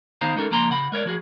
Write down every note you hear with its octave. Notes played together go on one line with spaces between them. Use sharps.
D#3 B3 D#4 C5 F5 A#5
G#3 C#4 D#4 G4 A4 A#4
C#2 F3 A#3 A#5 C6
C#3 F#5 B5
G#3 A#4 C#5 D5
F3 F#4 G#4